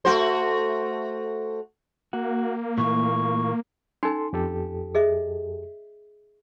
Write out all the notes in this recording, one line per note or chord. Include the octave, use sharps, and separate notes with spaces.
A3 F#4 C5
A#3 F#4
A#2 E3 A3 C#6
C#4 D#4 A4 G#5 C6
F2 G4 A4
G#4 D#5 E5